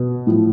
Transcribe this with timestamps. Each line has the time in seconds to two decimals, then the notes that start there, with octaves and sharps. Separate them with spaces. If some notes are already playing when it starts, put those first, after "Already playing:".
Already playing: B2
0.27 A2 F3